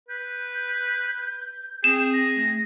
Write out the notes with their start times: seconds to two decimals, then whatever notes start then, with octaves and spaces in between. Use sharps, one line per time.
0.09 B4 G6
1.84 C4 G#4 E7
2.14 A#6
2.35 A3